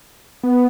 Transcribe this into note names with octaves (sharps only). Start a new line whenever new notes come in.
B3